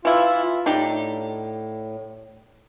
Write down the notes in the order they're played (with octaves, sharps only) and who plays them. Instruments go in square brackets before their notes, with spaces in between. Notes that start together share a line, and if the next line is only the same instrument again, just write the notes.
[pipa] E3 E4 [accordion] F4
[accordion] A2 [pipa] D4 D#4 G4